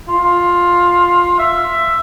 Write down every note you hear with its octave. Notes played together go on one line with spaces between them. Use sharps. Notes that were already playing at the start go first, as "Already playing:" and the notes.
F4
E5